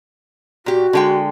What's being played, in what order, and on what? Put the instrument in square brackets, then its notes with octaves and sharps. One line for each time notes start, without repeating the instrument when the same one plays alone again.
[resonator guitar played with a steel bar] A#2 G4 [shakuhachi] F#4
[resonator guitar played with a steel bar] D3 G#3 G5